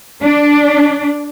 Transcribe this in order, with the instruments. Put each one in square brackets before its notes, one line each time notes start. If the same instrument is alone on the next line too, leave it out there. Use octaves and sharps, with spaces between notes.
[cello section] D4